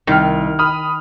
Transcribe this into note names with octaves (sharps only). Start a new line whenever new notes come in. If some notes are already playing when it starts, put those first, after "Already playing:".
C2 D#3 F6
B5 D#6 F6